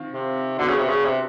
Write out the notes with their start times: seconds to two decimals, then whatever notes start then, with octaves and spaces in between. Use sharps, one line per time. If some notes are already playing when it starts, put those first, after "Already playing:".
Already playing: D#3 C4 F4
0.13 C3
0.58 D3 B3 D4 F#4 A4
0.69 C#3
0.79 C3
0.88 C#3
1.05 C3